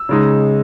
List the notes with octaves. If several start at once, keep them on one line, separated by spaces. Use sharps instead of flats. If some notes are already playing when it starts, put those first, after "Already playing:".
Already playing: E6
C#3 G#3 D#4